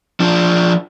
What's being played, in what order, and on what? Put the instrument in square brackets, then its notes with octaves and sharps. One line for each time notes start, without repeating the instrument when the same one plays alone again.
[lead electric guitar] F3 D4